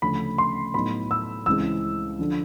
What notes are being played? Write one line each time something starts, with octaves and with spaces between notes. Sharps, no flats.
D2 C#3 F3 A3 C#4 B5
C6
A2 F#3 B3 D#4 B5
E6
C#2 C#3 E3 G#3 C4 E6
D3 F3